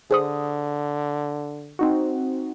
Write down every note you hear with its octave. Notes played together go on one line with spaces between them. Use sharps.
D3 G#4 C5 D#6
C4 D#4 F#4